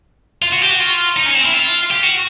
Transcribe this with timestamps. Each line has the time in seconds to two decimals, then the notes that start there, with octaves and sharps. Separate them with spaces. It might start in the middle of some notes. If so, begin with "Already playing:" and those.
0.42 F4
0.53 F#4
0.62 G4
0.71 F#4
0.80 F4
1.17 D#4
1.26 C#4
1.35 C4
1.45 E4
1.54 F4
1.91 G4
2.03 F#4